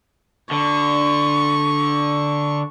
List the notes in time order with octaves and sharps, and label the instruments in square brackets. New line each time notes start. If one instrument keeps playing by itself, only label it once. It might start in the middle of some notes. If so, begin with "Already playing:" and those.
[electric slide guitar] D3 [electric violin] C#6